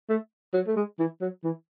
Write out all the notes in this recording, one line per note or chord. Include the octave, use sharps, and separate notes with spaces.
A3
F#3
A3
G#3
E3
F#3
E3